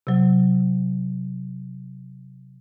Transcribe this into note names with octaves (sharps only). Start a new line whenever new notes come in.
C3 F#3